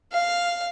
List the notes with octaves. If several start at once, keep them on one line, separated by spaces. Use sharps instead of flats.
F5